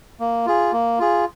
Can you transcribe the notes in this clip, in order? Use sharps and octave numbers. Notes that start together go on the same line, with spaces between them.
A#3
F4 G#4
A#3
F4 G#4